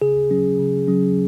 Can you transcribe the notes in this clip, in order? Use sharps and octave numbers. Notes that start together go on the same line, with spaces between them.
C#3 G#4
F#3 C#4
C#3
F#3 C#4